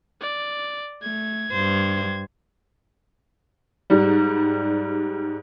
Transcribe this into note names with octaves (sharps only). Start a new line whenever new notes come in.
D5
A3 G#6
G2 C5
G#2 G3